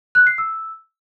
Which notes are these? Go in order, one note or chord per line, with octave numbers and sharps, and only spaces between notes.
F#6
C7
E6